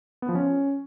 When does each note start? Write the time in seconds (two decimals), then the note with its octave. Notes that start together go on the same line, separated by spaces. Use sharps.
0.22 B3
0.29 F3
0.35 C#4